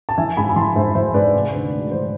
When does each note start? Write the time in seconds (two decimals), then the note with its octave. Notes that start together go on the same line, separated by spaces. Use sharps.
0.09 A5
0.18 E3 E5 G#5
0.37 G#2 G#5 B5
0.49 B5
0.56 E3 A5 C6
0.76 G#2 C5 E5
0.95 E3 C5 E5
1.14 G#2 B4 D5
1.34 C3
1.53 D2
1.72 D2
1.91 E3 C5